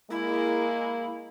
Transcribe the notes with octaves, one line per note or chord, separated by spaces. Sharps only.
G#3 A#3 E4